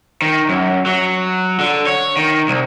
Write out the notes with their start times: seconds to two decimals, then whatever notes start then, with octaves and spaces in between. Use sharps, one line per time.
0.22 D#3
0.49 F#2
0.86 F#3
1.59 D3
1.86 C#5
2.17 D#3
2.48 C2